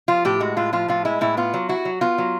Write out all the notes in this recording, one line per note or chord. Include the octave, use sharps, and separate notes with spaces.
F3 F4
A2 G4
G#3 F#4
A2 F4
F3 F4
A2 F4
G#3 E4
A2 E4
B3 F4
F#3
E4 F#4
F#3
B3 F4
F#3